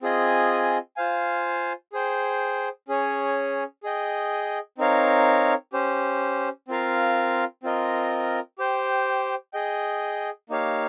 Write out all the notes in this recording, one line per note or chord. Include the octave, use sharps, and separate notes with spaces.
C4 F4 G#4 D#5 G#5
F4 C5 F5 G#5
G#4 C5 G5
C#4 G#4 C#5
G#4 D#5 G5
C4 D#4 A#4 C#5 F5
C#4 G4 C5
C4 F4 A#4 F5
C4 F4 A#4 D#5
G4 C5 G5
G#4 D#5 G5
A#3 D#4 G4 C#5 F5